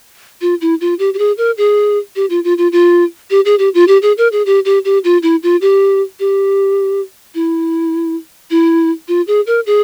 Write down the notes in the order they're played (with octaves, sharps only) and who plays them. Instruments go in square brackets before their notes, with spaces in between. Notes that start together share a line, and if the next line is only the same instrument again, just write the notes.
[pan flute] F4
E4
F4
G4
G4
G#4
A#4
G#4
G4
F4
F4
F4
F4
G4
G#4
G4
F4
G4
G#4
A#4
G#4
G4
G4
G4
F4
E4
F4
G4
G4
E4
E4
F4
G#4
A#4
G#4